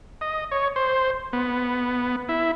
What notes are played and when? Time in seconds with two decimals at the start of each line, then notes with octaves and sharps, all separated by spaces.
0.21 D#5
0.52 C#5
0.76 C5
1.33 B3
2.29 E4